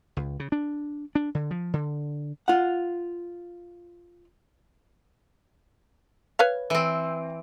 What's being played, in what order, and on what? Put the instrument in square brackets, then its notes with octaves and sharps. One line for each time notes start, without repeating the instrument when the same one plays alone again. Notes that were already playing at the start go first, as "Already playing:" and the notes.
[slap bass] C#2
C#3
D4
D4
D3
F3
D3
[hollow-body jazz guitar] F4 F#5
[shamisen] B4 C#5 F5
[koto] E3 C4